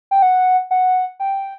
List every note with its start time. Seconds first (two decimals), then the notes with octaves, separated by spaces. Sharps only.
0.11 G5
0.22 F#5
0.71 F#5
1.20 G5